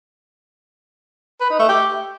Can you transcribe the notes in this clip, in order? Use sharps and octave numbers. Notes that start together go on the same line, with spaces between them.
B4
D#4
A3
G4